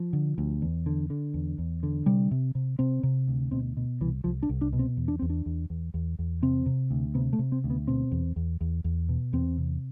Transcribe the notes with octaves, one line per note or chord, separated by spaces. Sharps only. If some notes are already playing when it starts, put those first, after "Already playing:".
Already playing: F3
D3
D2
E2
D3
D3
E2
E2
D3
C3 G3
C3
C3
C3 C4
C3
D2
B2 C4
B2
C2 E3
C2 F3
D4
C2
D4
B2
C4
E2
D4
E2 C4
D4
E2
E2
E2
E2
C3 C4
C3
D2
C3 B3
A3
C3
C4
D2
B3
B2 C4
E2
E2
E2
E2
B2
E2 C4
C3